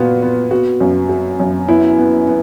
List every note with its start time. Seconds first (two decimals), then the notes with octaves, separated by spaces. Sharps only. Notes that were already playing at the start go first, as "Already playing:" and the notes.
Already playing: A#2 B3 F#4
0.22 B3
0.51 B3 F#4
0.80 F#2
1.09 F#3
1.40 F#2
1.69 B3 E4
1.98 B3
2.27 B3